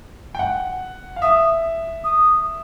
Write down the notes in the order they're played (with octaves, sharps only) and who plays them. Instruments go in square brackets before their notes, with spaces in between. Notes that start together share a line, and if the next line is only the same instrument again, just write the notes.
[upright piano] G5
F#5
F5
[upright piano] E5 [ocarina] D#6
[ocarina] D#6